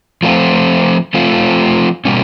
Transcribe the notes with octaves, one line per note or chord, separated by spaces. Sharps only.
F3 A3 C4 F4
F3 A3 C4 F4
B2 G3 A#3 C#4